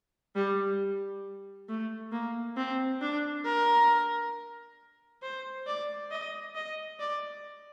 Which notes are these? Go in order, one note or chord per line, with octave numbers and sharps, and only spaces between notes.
G3
A3
A#3
C4
D4
A#4
C5
D5
D#5
D#5
D5